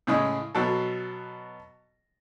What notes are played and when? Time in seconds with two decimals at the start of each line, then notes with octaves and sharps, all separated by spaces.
0.07 A2 C#3 G#3
0.55 B2 F#3 A4